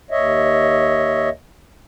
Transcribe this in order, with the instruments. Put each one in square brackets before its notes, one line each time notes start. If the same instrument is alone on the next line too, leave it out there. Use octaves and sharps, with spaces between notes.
[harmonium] D#2 C#5 D#5 E5